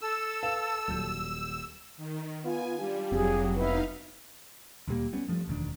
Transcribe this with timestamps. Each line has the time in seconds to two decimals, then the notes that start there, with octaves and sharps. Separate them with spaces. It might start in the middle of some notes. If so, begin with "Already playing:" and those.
0.01 A4 E6
0.43 B4 F5
0.88 D#1 F#3 G6
1.97 D#3
2.45 B3 F4 G#5
2.79 G3 D4 F4 G4
3.12 F1 F#3 C4 G#4
3.56 D2 B3 D#4 E4 B4 F5
4.88 D2 A#2 G3 A#3
5.13 G3 B3 C#4
5.28 G2 F3 A3
5.48 E1 D2 D#3 D4